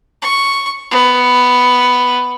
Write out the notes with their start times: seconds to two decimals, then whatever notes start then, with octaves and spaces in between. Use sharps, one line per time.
0.22 C#6
0.91 B3